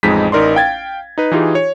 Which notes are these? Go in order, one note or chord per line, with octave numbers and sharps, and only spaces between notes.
A1 F2 G#3 D#4 B6
A1 D#4 A#4 D5 C6
F5 G5 G#6 A6
D#4 B4
E3 D#4 F4 G4 G#4
C#5